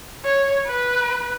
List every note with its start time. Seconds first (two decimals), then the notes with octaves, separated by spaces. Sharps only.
0.25 C#5
0.66 B4